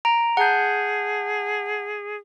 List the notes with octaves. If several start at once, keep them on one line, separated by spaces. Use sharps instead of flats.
A#5 D7
G#4 F#5 A5 G6